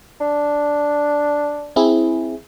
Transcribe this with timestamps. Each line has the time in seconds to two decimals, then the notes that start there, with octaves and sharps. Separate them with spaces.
0.21 D4
1.76 C4 E4 G#4